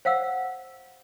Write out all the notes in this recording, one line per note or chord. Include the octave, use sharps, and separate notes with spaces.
C5 F5 F#5 E6